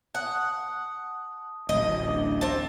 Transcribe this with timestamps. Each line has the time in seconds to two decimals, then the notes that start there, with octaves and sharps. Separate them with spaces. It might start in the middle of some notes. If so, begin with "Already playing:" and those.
0.15 F#5 A5 D#6
1.69 D1 A1 D#5
2.07 D4
2.41 C4 A5